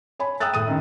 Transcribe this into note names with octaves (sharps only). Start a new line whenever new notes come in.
C#5 G#5 B5
G5 A#5 D#6 E6 F#6 A6
A2 D#6 D#7
F#2 D#3